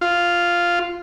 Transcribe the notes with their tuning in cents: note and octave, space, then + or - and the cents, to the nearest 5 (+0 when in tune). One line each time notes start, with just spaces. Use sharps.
F4 -5